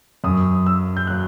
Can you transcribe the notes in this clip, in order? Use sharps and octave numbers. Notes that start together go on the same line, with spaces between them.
F#2 F#3 D#6
E6
G6
F#3 F#6